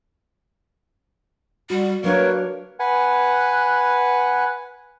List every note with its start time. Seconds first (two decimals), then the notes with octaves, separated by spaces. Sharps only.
1.70 G3 F#4
2.04 F#3 A#3 D4 A#4 B4 C#5
2.79 B4 F#5 G#5